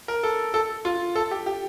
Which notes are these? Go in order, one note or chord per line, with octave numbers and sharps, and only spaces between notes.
A#4
A4
A4
F4
A4
G4
G4